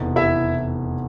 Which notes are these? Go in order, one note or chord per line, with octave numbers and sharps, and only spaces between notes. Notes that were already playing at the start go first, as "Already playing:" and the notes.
Already playing: F1 E2 B2
E4 E5